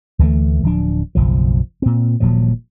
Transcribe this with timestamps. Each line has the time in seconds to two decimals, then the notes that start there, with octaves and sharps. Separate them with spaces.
0.19 D2 E3 G#3 A3
0.63 D1 F3 D4
1.15 F#1 B1 F3
1.82 A#2 C4
2.20 D#1 A#2 F3 F#3